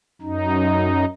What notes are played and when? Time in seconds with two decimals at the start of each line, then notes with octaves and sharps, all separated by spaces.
0.22 F#2 D#4